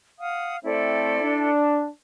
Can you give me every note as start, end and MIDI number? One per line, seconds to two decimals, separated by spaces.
0.19 0.57 77
0.19 0.57 78
0.19 0.57 87
0.64 1.18 57
0.64 1.18 60
0.64 1.51 64
0.64 1.51 69
0.64 1.51 74
1.21 1.87 62